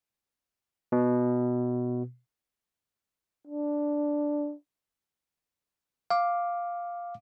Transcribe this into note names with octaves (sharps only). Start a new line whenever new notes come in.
B2
D4
F5 D6